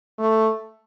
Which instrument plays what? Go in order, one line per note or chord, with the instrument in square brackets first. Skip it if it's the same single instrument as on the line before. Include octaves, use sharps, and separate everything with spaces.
[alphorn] A3